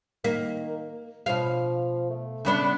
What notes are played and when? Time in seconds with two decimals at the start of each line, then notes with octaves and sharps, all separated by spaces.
0.24 D#3 A#3
1.26 B2 F3 F5
2.10 A3
2.45 C#3 B3 D4